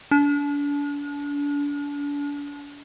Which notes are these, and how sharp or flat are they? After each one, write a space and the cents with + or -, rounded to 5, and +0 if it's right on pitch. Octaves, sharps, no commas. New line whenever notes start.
D4 -35